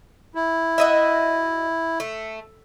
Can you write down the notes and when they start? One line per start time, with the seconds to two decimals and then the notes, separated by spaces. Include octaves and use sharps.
0.35 E4
0.78 F#4 D#5 E5
2.00 A3